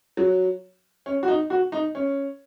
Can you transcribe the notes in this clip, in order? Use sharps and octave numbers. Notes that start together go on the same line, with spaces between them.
F#3
C#4
F#4
D#4
F#4
D#4
C#4